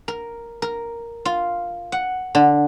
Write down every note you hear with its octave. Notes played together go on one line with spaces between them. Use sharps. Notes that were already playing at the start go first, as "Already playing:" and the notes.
A#4
A#4
F4
F#5
D3